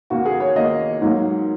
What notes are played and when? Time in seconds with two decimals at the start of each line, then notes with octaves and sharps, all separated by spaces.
0.10 D#2 D#3 A#3 F#4
0.25 G#4
0.40 C#5
0.55 D#2 D#3 A#3 D#5
1.01 G#2 F#3 A#3